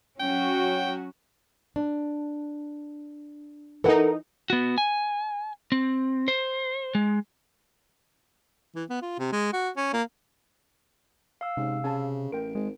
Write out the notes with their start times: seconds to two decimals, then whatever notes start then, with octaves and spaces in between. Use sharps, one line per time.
0.20 F#3 C#4 F#4 G5
1.76 D4
3.84 E3 D#4 A4 A#4 F#5
4.50 B3 F#4
4.78 G#5
5.72 C4
6.28 C5
6.95 G#3
8.75 E3
8.90 B3
9.02 F4
9.19 C3
9.32 G#3
9.53 F#4
9.77 C#4
9.93 A#3
11.41 F5 E6
11.57 G#2 C3 C#4
11.84 C#3 G#5 A5
12.32 A1 A#4 G5 D7
12.55 G#1 G#3